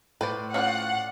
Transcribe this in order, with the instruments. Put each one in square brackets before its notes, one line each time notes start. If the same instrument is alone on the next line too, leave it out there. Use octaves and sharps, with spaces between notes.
[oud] A2 [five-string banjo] B4 C5 D5
[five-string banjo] C#4 F4 C5 [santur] D5 F5 [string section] F#5